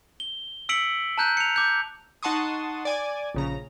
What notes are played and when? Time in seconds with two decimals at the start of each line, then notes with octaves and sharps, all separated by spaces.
0.20 G7
0.69 E6 B6 C#7 D7 F#7
1.18 A5 A#5 F#6 G6
1.37 C#7 F7
1.56 D6 G6
2.23 D#4 F#5 A5 C6 C#6 D#6
2.85 D5 G#5
3.35 A#1 C#3 A#5